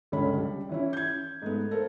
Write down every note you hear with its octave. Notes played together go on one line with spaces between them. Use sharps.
G1 C#2 C#4 B5
G3
E3 C#4 E4
G6 G#6
G#2 A3 B3
A4 A#4 C5